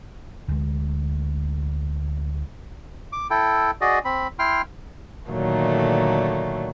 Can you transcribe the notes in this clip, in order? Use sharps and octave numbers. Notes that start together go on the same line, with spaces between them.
D2 G#3
D6
E4 A4 G5
F#4 G#4 D5 D#5
C4 B5
E4 G5 C6 F6
A#2 D3 D#3 F#3 A3 A#3